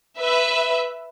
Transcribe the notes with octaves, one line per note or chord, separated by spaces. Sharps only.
B4 E5